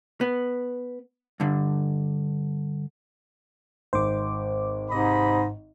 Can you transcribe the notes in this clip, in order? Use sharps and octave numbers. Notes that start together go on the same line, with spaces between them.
B3
G2 D3
G#1 C5 D6
G#2 C3 D#5 B5